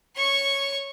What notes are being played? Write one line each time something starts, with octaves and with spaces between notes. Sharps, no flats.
C#5 C#6